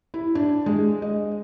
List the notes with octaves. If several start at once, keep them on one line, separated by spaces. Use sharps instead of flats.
E4
D4
G#3
D#5